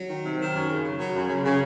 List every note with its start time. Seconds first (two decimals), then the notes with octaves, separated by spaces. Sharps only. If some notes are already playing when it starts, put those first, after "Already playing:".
Already playing: F#3
0.09 D#3
0.25 C3
0.40 D#3
0.54 F#2
0.68 C#3
0.84 C#3
0.98 F#3
1.13 F#2
1.29 C#3
1.44 C#3